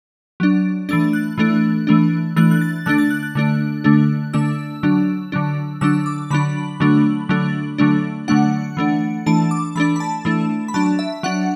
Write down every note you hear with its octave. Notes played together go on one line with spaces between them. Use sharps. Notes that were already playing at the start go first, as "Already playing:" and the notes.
F#3 D4
E3 A3 D4 A6
F#6
E3 A3 D4
E3 A3 D4
E3 A3 D4 F#6
F#6
A6
D3 A3 D4 F#6
A6
F#6
F#6
D3 A3 D4
D3 A3 D4
D3 A3 D4 E6
D3 F#3 D4
D3 F#3 D4
D3 F#3 D4 E6
D6
D3 F#3 D4 B5
D3 F#3 A3 D4
D3 F#3 A3 D4
D3 F#3 A3 D4
D3 F#3 A3 D4 F#5
E3 A3 D4
E3 A3 D4 A5
D6
E3 A3 D4 B5
B5
A5
E3 A3 D4
B5
F#3 D4 A5
E5
F#3 D4 F#5